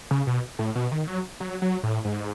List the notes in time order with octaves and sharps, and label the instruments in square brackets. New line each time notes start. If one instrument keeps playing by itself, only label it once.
[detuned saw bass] C#3
B2
A2
B2
D#3
F#3
F#3
F#3
A2
G#2